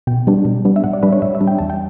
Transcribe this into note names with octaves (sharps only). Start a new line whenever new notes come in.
B2 G5
G3 B3 D4
B2
G3 B3 D4
E5
A2 F#5
D5
G3 D4 B4
C#5
A2 E5
E5
G3 D4
G5
E2 A5
G5